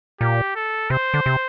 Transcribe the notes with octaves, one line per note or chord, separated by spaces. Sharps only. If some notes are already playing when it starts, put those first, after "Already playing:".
A#2 G4
A4
C3 C5
D3
C3